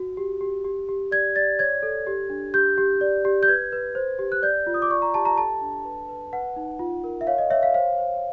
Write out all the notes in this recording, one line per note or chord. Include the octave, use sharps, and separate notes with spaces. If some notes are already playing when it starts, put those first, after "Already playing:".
Already playing: F#4
G4
G4
G4
G4
D5 G#6
D5 A6
C#5 G#6
A4
G4
D4
G4 G6
G4
D5
G4
G6
B4 G#6
B4
C5
G4
F#6
D5 G6
F4
D#6
D6
D5 C#6
A#5
G4 A5
A#5
A4 A5
D4
B4
B4
B4 F#5
D#4
F4
A#4
E5
C#5 F5
D#5
C#5 E5
F5
C5 F5
C5